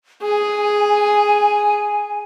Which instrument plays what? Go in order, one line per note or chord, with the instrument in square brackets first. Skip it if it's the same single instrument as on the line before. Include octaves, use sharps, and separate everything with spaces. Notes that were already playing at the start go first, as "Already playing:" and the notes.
[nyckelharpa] G#4 [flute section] G#5